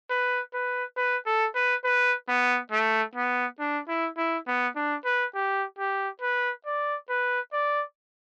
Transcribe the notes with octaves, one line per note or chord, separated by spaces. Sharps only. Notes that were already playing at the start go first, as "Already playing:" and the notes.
B4
B4
B4
A4
B4
B4
B3
A3
B3
D4
E4
E4
B3
D4
B4
G4
G4
B4
D5
B4
D5